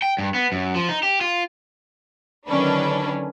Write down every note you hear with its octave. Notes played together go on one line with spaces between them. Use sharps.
G5
G2
B3
F#2
F3
D#4
G4
F4
D3 D#3 F#3 C#4 D4 B4